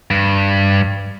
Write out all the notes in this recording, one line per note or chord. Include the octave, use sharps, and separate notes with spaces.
G2